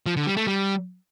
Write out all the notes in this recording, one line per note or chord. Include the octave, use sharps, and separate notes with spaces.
F3
D3
G3
A3
G3